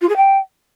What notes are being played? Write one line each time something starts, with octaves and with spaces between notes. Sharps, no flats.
F4
G#4
G5